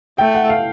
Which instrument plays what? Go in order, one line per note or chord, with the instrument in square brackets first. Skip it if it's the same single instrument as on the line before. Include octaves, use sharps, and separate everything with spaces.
[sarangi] A3 [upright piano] G5
[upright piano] F#5
F5